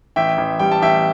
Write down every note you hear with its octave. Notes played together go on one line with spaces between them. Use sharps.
A1 E5 G5
A1
G3 G5
A5
A1 E5 G5